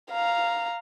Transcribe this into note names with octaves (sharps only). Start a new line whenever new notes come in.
F5 A#5